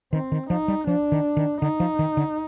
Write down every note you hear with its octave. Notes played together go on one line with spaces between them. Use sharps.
D#3 C4
D#3
F3 D#4
G3
F3 D4
D#3
D#3
D3 D#4
F3
D#3
D3